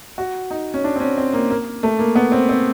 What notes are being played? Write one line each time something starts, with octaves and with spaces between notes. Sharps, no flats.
F#4
D#4
C#4
D4
C4
C#4
C4
A#3
A#3
A3
A#3
B3
C4
C4